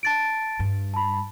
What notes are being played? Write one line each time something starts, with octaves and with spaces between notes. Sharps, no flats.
A5 A6 D7
G2
A5 B5